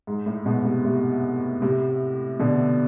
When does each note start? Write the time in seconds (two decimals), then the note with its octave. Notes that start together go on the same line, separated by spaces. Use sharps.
0.07 G#2
0.26 A2
0.46 G#2 B2
0.64 A2 C3
0.84 A2 C3
1.62 A2 C3
2.39 B2 D3